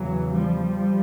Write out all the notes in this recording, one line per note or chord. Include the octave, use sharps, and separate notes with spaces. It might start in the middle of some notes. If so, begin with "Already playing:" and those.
Already playing: E2 C#3 E3 F#3
F3 G3